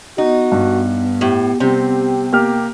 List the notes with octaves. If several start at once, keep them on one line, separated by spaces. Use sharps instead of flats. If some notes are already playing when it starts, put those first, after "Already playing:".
B3 D#4 F#4
G2
A2 G4
C3 G3 C4 G4
A#3 G4 F6